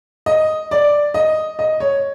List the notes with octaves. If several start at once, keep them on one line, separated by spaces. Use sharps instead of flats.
D#5
D5
D#5
D#5
C#5